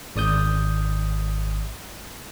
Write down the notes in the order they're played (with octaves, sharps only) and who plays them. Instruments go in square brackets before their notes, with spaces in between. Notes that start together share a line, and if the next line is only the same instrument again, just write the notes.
[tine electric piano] G#1 D5 D#6 G6